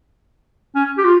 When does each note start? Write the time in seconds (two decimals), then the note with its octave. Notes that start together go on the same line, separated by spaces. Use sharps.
0.75 C#4
0.98 G4
1.05 F4